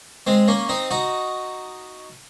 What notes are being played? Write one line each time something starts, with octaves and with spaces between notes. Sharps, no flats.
G#3 C4
A#3 C#4
C4 D#4
D#4 F#4